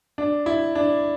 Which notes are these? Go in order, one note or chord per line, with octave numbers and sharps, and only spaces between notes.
D4
E4
D4